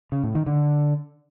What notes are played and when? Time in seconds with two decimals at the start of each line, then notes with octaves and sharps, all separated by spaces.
0.12 C#3
0.23 A2
0.35 D#3
0.47 D3